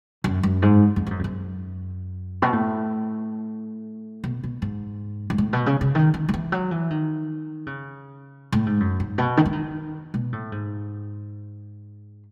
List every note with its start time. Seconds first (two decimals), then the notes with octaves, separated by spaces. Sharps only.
0.24 F#2
0.43 F#2
0.62 G#2
0.96 F#2
1.07 G#2
1.11 F#2
1.19 E2
1.24 F#2
2.42 B2
2.53 A2
4.24 B2
4.43 B2
4.62 G#2
5.30 G#2
5.38 A2
5.53 B2
5.66 C#3
5.81 C#3
5.95 D#3
6.14 D#3
6.29 D#3
6.34 E3
6.52 F#3
6.71 E3
6.90 D#3
7.66 C#3
8.52 A2
8.66 G#2
8.80 F#2
9.00 G#2
9.18 B2
9.37 D#3
9.46 E3
9.53 D#3
10.14 B2
10.33 A2
10.52 G#2